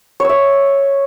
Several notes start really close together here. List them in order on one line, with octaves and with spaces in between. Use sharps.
C#5 E6 E5